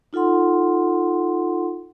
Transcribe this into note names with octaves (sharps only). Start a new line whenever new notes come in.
D#4 F4 A4 F#5 C6